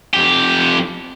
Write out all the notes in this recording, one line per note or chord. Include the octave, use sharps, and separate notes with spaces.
F2 G4